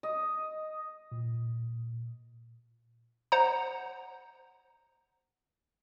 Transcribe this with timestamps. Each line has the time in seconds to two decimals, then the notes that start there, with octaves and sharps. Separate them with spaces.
0.03 D#5
1.12 A#2
3.32 C5 F#5 A#5